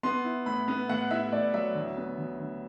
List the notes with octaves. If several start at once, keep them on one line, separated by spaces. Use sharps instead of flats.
B3 C6
E4
A2 B5
B3
A2 F#5
E4 E5
A2 D5
F#3 E5
D2
B3
D2
D2